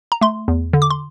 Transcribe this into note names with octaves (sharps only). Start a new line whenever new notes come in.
A#5
A3 C6
E2
D3
D6
C6